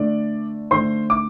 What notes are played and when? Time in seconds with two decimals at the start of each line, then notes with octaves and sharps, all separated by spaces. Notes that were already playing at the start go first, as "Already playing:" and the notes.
Already playing: D3 A3 D4 D5
0.71 D3 A3 D4 C5 C6
1.10 D6